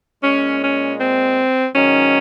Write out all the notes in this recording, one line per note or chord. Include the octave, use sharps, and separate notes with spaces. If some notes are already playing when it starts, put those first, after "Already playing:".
A#2 G#3 C#4
C#4
C4
G#2 D#3 F#3 C#4